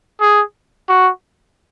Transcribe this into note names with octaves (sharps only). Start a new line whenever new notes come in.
G#4
F#4